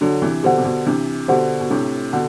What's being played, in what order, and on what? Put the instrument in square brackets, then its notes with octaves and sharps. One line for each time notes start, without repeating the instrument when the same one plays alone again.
[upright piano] D3 F#3 [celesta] D4
[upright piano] C3 E3
[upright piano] B2 D3 [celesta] G4 C5 F#5
[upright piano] C3
B2 D3
[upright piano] C3 E3 [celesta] D4
[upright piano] B2 D3 [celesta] G4 C5 F#5
[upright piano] B2
[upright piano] A2 C3 [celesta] D4
[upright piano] B2 D3 [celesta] F#5